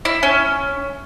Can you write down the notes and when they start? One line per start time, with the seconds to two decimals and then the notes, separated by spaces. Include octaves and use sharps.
0.05 E4
0.23 C#4